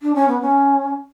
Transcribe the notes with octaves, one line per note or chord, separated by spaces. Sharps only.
D4
C#4
B3
C#4